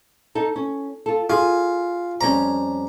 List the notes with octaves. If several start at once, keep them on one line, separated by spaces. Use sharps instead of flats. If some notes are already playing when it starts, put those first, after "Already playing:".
D#4 A4
C#4
F4 A4
F4 G#4
F2 G3 C#4 A#5